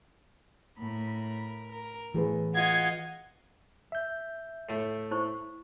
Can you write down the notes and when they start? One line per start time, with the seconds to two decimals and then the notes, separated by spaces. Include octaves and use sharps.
0.80 A2 A#4 B5
1.71 A#4
2.14 A2 E3 G#4 B4
2.54 F4 D#5 F5 F#5 G#6
3.92 E5 G6
4.69 A2 A3
5.11 E4 C5 C#6